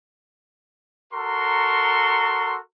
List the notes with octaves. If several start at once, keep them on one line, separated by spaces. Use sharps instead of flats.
F#4 A4 A#4 A#5 C6 C#6